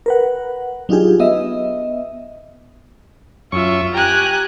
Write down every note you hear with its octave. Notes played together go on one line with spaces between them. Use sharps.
A#4 B4 F#5
F#3 D4 D#4 F4 G4 G#4
B3 D#5 E5
F#2 F4 E5 C#6
G4 G5 G#5 A#5 F#6